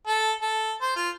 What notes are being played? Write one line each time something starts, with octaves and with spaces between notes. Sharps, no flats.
A4
A4
C5
F4